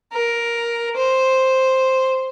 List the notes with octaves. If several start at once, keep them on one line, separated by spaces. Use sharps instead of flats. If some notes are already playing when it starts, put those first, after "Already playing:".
A#4
C5